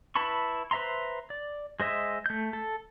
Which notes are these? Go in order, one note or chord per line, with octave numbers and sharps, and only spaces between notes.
E4 B4 A5 B5 C#6
B4 C5 E5 A#5 C6
D5
G#3 C5 D#5 E5
A3 G6
A4